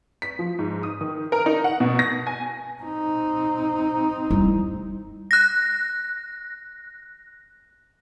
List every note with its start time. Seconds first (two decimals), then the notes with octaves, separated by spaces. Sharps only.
0.22 B6
0.39 F3
0.59 G#2
0.83 D#6
1.01 D#3
1.32 A#4
1.46 D#4
1.64 F#5
1.80 B2
1.99 A#6
2.27 G#5
2.82 C4 D#4
4.31 G3 E4
5.31 F#6 A#6